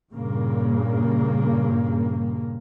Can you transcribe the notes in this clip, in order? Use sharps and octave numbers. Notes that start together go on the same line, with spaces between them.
G2 A#2 C#3 A#3